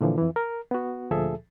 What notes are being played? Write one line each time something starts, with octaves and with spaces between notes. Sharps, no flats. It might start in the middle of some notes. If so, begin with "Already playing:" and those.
A#2 D3 E3 F3
F2 E3
A#4
B3 F#4
D2 A#2 F3 G#4 A4 E5